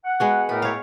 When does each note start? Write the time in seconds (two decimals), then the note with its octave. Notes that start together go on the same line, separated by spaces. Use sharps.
0.05 F#5
0.20 G#3 B3 F#4
0.49 A2 A3 A#4 B4
0.62 C#5 F5